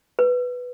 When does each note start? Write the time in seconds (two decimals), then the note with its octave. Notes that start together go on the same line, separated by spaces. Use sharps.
0.19 B4